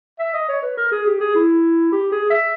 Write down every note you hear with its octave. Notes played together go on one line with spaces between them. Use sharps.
E5
D#5
C#5
B4
A#4
G#4
G4
G#4
E4
G4
G#4
E5